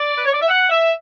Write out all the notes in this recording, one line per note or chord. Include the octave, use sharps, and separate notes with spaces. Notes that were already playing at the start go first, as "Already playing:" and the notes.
Already playing: D5
B4
C#5
D5
E5
F#5
E5